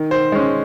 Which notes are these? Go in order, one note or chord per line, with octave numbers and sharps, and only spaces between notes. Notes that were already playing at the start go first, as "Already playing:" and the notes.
Already playing: D#3
C5
G#3 C#4